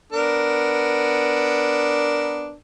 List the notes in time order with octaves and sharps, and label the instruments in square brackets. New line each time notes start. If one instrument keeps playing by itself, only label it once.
[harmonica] B3 D4 A#4